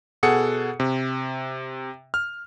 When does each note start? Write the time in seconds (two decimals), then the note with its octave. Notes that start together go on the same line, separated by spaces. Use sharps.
0.23 B2 G#4 A4 F#5 C#7
0.80 C3
2.14 F6